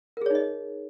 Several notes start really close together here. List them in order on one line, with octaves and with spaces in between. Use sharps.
A#4 G#4 C#5 D#4 D#5